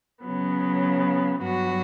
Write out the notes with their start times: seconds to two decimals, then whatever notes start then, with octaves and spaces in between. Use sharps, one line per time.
0.24 C#3 F#3 B3
1.43 G2 F#3 B3 F#4